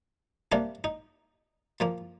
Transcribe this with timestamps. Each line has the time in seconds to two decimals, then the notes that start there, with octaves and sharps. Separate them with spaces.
0.52 C3 G3 A#3 D4
0.84 D#4
1.80 A#2 F3 A#3